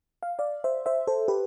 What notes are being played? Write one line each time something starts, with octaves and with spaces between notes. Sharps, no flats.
F5
D5 F5
C5 E5
C5 E5
A4 C5
G4 B4